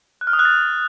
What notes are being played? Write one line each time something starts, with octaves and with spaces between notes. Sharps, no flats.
F#6
F6
D#6
F#6
A6